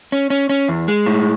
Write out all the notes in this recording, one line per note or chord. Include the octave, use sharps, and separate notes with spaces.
C#4
C#4
C#4
E2
G#3
A2